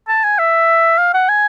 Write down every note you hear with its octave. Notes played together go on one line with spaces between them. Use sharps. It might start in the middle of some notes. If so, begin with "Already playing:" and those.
A5
G#5
E5
F5
F#5
G#5